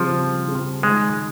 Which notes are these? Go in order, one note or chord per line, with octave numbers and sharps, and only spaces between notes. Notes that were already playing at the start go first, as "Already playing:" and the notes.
Already playing: C#3 F3 G3 C4 F4 G#4
C#3
G3 C4 F4 G#4
D#3 G#3